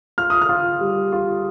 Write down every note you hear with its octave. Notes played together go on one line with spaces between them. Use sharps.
F4 F6
D#6
F6
F4
G3
F4